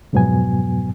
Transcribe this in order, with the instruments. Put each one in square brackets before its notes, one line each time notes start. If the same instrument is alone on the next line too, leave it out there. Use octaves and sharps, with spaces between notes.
[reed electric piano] F2 G#2 B2 F#3 B3 G#5